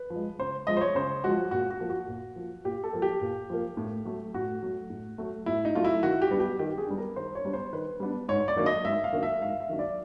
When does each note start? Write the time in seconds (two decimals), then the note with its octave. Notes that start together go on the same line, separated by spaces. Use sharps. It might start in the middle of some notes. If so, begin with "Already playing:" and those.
Already playing: B4
0.10 F3
0.16 G#3
0.39 C#3 C5
0.67 F3 G#3 D#5
0.77 C5
0.81 C#5
0.95 C#3 C5
1.24 F3 G#3 F#4
1.51 A#2 F#4
1.71 F#4
1.80 F3 A#3
1.90 F#4
2.08 A#2
2.36 F3 A#3
2.64 A#2 G4
2.84 A4
2.93 F3 A#3
3.02 G4
3.21 A#2
3.50 F3 A#3
3.77 A2
4.05 F#3 A3
4.34 A2 F#4
4.63 F#3 A3
4.90 A2
5.18 F#3 A3
5.46 A2 E4
5.65 D#4
5.75 F#3 A3 F4
5.84 E4
6.03 D#3 F#4
6.22 G4
6.31 G3 B3 D4
6.40 G4
6.59 D#3 G4
6.78 G#4
6.87 G3 B3 D4
6.98 A#4
7.16 D#3 C5
7.35 C#5
7.45 G3 B3 D4
7.53 C5
7.73 D#3 B4
8.00 G3 B3 D4
8.29 G#2 C#5
8.48 D5
8.56 D#3 F#3 A#3 D4
8.66 D#5
8.85 G#2 E5
9.04 F5
9.13 D#3 F#3 A#3 D4
9.23 E5
9.41 G#2 F5
9.60 E5
9.69 D#3 F#3 A#3 D4
9.79 D5